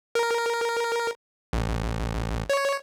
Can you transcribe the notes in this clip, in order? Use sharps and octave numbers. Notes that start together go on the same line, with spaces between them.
A#4
A1
C#5